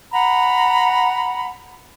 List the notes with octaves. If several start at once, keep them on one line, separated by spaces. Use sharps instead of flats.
F#5 A#5 B5